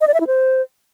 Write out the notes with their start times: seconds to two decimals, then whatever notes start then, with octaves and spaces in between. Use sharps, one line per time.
0.01 D#5
0.07 D5
0.14 E5
0.20 E4
0.27 C5